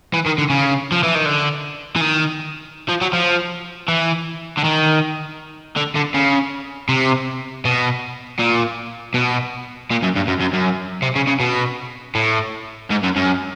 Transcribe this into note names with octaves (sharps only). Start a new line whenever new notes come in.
E3
D#3
D3
C#3
F3
E3
D#3
D3
E3
D#3
F3
F#3
F3
E3
D3
D#3
D3
D3
C#3
C3
B2
A#2
B2
A#2
F#2
G2
F#2
F#2
F#2
C3
C#3
C#3
B2
A2
G#2
F#2
F#2